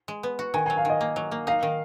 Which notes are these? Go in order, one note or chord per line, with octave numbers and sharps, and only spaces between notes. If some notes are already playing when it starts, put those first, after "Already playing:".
G#3
B3
F#4
D#3 G#5
F#3 G#5
F5
D#3 D#5
A#3
F#3
A#3
D#4 F5
D#3